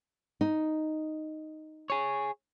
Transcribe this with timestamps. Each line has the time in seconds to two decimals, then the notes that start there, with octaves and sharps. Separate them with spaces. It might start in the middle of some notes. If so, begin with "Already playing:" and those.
0.41 D#4
1.90 G#4 C#5